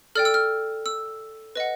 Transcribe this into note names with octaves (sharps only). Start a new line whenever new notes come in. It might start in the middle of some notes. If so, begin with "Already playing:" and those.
A4 D5 G5 F6
E6
F6
E6
B4 D#5 F#5